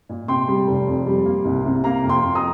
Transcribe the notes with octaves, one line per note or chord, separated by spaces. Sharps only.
A#2
C3 G5 C6
G3
F1
F2
G3
A#3
C2
C3
A#3 F5 A#5
F2
G5 C6
F2
A#5 D#6